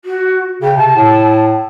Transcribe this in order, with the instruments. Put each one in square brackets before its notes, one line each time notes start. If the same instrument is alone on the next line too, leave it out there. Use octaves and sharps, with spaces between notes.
[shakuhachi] F#4
[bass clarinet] C#3 [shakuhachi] G5
[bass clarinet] C3 [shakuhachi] A5
[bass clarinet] A2